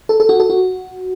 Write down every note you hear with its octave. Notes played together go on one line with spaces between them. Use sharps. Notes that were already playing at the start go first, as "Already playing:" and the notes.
A4
A4
F#4
A4
F#4